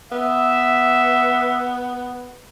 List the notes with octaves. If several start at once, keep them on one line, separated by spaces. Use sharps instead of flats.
B3 E5